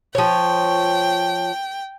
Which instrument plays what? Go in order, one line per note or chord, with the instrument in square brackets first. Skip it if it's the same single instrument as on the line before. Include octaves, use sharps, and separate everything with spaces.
[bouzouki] F3 C#5 [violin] G5